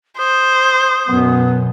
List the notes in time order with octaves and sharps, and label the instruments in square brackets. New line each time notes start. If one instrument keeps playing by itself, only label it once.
[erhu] C5 [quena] D#6
[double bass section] F#2 B2 [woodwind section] B3